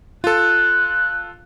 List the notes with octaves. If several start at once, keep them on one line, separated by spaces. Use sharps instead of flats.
F4 A4 F#6